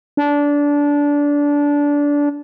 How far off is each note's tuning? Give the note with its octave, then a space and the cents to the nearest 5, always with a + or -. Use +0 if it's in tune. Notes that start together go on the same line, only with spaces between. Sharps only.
D4 -20